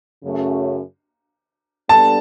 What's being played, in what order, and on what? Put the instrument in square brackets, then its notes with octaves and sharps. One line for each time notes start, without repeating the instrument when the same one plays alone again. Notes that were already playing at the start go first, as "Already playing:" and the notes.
[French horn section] F#2 C#3 F#3 A3 C#4
[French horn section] G3 B3 D4 A4 [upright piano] A5